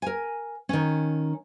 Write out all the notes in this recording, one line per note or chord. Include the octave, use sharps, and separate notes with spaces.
A#4 G#5
D#3 C#4